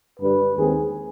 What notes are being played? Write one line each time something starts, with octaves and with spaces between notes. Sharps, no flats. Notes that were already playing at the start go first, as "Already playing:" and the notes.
G2 D3 G3 B4
D#2 D#3 G#3 C4 G#4